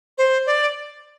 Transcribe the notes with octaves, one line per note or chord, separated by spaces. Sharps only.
C5
D5